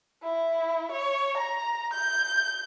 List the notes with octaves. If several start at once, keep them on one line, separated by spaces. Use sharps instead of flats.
E4
C#5
A#5
G6